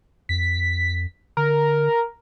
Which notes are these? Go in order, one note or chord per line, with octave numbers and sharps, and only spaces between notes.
F2 B6
D3 A#4